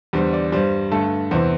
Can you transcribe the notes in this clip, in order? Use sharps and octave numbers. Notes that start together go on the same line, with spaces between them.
E2 D3 G3 C5
D5
G2 G3 C5
G2 D3 A3 A4
E2 C3 E3 C5